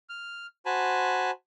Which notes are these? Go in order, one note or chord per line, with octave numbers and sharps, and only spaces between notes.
F6
F#4 C5 G#5 A5 B5